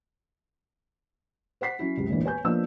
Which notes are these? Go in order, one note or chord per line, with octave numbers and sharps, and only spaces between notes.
C5 F#5 B6 C7
F#3 C#4 E4
C#2 F#2 C3
E1 A1 A#2 D3 E3
B4 C#5 G#5 G6
F3 A#3 B3 D4 D#5 E6